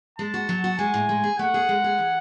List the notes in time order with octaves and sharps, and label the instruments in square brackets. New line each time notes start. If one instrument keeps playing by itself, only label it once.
[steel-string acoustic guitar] G#3 [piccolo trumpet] A5
[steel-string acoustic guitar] F#4
F#3
F#4
[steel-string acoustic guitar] G#3 [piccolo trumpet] G#5
[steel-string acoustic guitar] A2
G#3
G#4
[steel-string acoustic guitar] A3 [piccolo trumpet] F#5
[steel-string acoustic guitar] G#4
G#3
G#4
E3